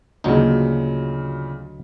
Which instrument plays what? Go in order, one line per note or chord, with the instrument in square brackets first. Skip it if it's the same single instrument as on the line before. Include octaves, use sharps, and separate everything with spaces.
[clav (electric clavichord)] D2 F#3 D#4 [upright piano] A#2 C#3